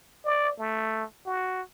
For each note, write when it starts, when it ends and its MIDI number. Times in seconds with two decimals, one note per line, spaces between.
0.24 0.53 74
0.59 1.04 57
1.26 1.61 66